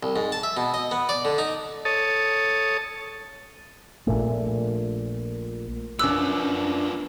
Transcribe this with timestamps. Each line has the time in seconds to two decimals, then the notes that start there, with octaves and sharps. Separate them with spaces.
0.03 C2
0.16 G#2
0.32 A5
0.43 E5
0.57 B2
0.74 D#5
0.91 B3
1.09 D5
1.25 D3
1.38 D#4
1.85 A4 C#5 A5 D#6
4.07 A#1 A#2 A3
5.99 F#2 F3 B3 D4 D6 E6 F#6